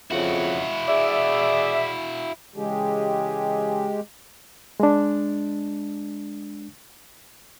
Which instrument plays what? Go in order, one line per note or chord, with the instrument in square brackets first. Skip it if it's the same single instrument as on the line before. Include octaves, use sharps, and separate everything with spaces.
[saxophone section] F2 C#3 [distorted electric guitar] E4 F#4
[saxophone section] G#4 D5 E5
[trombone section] C#3 E3 G#4 [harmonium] G#3 G4
[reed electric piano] G#3 D4